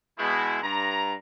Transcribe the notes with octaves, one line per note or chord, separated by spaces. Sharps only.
B2 G#3 E4
G2 A#5